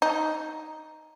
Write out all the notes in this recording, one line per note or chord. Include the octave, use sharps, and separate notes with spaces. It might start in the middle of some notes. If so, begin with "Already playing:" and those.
D#4